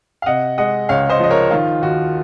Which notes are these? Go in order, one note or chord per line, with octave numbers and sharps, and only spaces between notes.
F5
C3 D#5 F#5
G#3 D#5 F#5
C#2 C#5 F5
C5 D#5
F3 D#5
A#4 C#5
D#3 F4
D#2 F#4